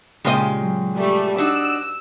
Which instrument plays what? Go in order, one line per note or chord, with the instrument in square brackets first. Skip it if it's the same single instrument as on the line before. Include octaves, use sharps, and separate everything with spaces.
[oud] A#2 G4 D#5 [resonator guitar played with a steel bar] C#3 G#3
[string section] F#3
G3 A3
[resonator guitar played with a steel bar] D4 D#4 F#4 [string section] E6